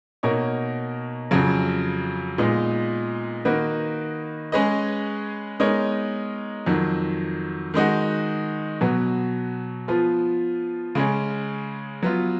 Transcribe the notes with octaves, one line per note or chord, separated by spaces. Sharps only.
B2 A#3 D#4 A#4 C#5
F2 C#3 F#3
A#2 G#3 B3 D#4
D#3 A#3 D#4 F#4 B4
G#3 C#4 G#4 B4 D#5
G#3 B3 D#4 A#4 C#5
F2 D#3 F#3
D#3 G#3 D#4 F#4
B2 F#3 B3
F3 B3 F4
C#3 G#3 C#4
F#3 B3 F4